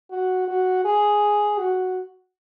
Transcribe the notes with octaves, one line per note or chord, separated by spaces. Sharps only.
F#4
F#4
G#4
F#4